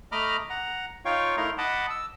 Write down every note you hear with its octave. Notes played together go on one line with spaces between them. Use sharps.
A3 D#5 A#5 B5 D6 F6
F#5 A#5
D#4 F4 C#5 F5 G5 C#6
A3 D#4 E4 A#4 A#5 C6
D#5 F#5 A5 B5 D6
E6